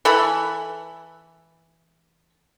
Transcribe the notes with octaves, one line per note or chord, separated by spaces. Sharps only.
E3 A4 E5 B5